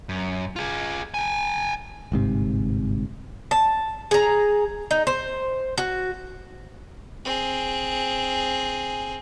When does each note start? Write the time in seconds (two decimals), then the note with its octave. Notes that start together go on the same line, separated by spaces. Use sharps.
0.09 F#2
0.56 F4 G#4
1.14 G5 G#5
2.12 G1 G#2 C3
3.51 A5
4.11 G#4 A#5
4.91 D#4
5.07 C5
5.78 F#4
7.25 C4 G#4